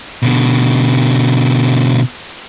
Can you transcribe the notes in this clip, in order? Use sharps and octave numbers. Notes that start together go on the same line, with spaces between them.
B2 D3